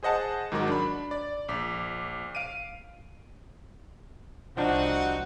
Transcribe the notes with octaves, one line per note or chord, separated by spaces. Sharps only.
G#4 C5 D#5 F#5 A5
G#2 D#3 F#3 F#4 A#4 D6
D4 B5
D5
A#1 D6 B6
F5 D7 D#7
C2 F3 C4 D4 D#4 F#4 F#5